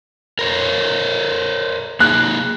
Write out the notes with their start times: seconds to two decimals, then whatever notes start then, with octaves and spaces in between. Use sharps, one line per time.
0.39 A#4 C5 C#5
2.00 A#3 D#4 G#4 F#6